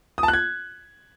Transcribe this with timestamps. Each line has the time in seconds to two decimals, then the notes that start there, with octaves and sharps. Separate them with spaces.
0.18 D#6
0.23 A5
0.28 F#6
0.34 G#6